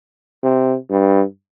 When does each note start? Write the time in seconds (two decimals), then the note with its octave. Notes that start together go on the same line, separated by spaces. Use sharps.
0.43 C3
0.90 G2